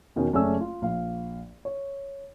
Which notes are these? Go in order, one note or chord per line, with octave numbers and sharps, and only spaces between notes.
E2 B2 D#3 C#4
F#1 A3 C#4 G#4 D5 E6
F4
A#1 F5
C#5